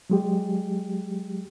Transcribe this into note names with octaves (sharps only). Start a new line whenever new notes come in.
F#3 G#3 G4